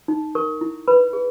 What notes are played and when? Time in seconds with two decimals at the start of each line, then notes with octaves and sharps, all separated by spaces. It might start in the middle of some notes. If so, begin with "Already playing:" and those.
0.08 D#4
0.35 A#4 C#6
0.61 E4
0.88 B4 B5
1.13 G#4